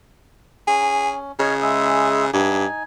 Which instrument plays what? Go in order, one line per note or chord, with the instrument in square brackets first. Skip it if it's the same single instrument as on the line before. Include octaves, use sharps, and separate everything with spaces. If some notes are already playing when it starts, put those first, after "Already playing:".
[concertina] C#4 [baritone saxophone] G#4
[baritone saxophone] C#3 [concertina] C#5 D#5 F6
[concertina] G#3 E5 D#6
[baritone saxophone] G2 [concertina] D#4 G#5